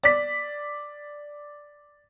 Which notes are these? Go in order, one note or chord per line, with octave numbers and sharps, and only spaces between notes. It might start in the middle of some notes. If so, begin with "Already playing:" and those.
D5 B6